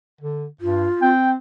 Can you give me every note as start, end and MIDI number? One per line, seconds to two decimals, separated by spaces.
0.21 0.46 50
0.61 0.87 43
0.61 1.11 65
1.01 1.35 60
1.01 1.31 79